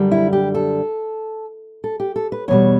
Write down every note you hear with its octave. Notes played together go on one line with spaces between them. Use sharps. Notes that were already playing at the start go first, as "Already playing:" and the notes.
Already playing: F#2 D3 G3
E4
G4
A4
A4
G4
A4
B4
E2 B2 G3 C#5